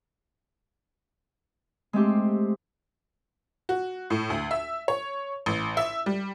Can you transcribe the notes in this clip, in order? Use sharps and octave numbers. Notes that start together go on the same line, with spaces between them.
G#3 A3 C4 G4
F#4
A2
D2
E5
C#5
A1
E5
G3